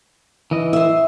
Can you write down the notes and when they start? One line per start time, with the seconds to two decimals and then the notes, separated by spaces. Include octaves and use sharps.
0.51 E3 D#5
0.73 C5 E5